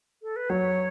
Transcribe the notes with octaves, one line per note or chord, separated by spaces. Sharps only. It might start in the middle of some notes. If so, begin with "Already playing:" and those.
A4
B4
F#3 C#5